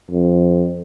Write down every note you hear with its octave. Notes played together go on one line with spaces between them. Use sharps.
F2